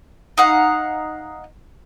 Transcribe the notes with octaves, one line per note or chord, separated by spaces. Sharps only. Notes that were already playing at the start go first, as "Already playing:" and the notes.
D#4 F5 F#5